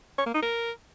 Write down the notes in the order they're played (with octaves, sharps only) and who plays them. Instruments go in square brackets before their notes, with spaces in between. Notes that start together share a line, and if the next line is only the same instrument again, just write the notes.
[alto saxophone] C#5
A#3
D#4
A#4